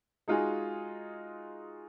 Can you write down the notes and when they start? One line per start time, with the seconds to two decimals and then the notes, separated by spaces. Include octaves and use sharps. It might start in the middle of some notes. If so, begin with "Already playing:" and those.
0.28 G#3 D#4 F4 F#4 G#4 G#5